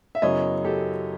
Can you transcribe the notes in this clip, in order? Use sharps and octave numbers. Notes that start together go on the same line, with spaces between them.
E5
F#2 C#3 F#3 B3 E4 C#5 D#5
G4 A4